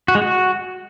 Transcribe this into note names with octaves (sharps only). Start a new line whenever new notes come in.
F#4
G#3
F#4